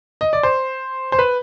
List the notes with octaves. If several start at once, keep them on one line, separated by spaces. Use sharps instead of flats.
D#5
D5
C5
C5
B4